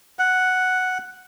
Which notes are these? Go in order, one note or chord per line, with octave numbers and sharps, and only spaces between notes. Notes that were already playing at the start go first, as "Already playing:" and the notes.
F#5